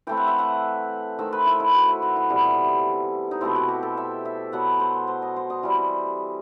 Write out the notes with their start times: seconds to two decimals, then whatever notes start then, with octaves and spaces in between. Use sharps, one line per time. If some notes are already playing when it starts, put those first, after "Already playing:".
0.07 E3 A3 C4 G5
0.17 F#5
0.27 E5
0.39 F#5
1.19 D#3 A3 C4 E5
1.33 B4
1.46 E4
1.60 E4
1.75 F#4
1.88 E4
2.02 F#4
2.16 E4
2.30 C3 E3 G3 B3
3.31 D#4
3.41 B2 A3 C4 E4
3.55 F#4
3.68 G4
3.83 A4
3.97 E5
4.25 E5
4.52 B2 F#3 B3 F#5
4.80 C5
5.08 C5
5.22 D#5
5.36 C5
5.50 D#5
5.63 E3 G3 C4